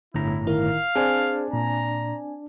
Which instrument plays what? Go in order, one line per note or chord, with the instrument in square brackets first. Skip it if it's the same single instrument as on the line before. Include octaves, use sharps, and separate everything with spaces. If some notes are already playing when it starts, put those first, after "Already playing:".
[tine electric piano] G1 A2 A#5 [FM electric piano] D3 [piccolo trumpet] E4
[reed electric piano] D#3 [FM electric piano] E4 A#4 [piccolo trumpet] F5
[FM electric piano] C4 D5 G#5 [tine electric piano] D4 [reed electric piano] G#4 C5
[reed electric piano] A#2 [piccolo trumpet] A#5